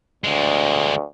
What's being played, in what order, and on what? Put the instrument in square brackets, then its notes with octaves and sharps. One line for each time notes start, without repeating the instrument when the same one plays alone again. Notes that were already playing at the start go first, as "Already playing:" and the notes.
[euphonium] D2 [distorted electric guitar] D3 G#3